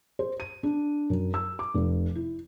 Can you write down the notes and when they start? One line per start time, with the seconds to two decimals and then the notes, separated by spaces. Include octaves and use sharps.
0.19 C5
0.40 D#7
0.63 D4
1.10 F#2
1.34 E6
1.59 D6
1.74 F1
2.15 E4